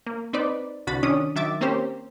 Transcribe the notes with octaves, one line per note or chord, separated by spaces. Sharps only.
A#3
C4 D#4 B4 C5 D5
C2 D3 F#4 B5 A6
D#3 C#4 D4 D#6
D#3 F#3 E5 D6 A6
A#3 C4 C#4 G4 C5